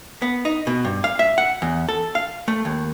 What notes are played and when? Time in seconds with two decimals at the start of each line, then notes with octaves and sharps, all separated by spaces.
0.22 B3
0.45 D#4
0.67 B2
0.85 G2
1.04 F5
1.19 E5
1.38 F#5
1.62 E2
1.89 A4
2.15 F5
2.48 A3
2.65 D#2